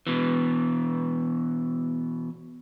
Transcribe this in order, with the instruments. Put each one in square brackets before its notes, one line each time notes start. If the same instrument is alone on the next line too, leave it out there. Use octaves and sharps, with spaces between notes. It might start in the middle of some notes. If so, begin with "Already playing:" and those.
[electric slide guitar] B2 E3